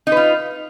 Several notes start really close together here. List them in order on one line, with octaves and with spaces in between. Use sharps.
D#4 B4 F4